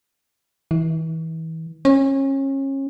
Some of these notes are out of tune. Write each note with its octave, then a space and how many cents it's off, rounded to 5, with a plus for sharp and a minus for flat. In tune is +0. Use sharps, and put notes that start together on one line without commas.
E3 -35
C#4 -30